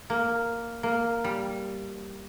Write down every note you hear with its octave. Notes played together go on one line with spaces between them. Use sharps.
A#3
A#3
G3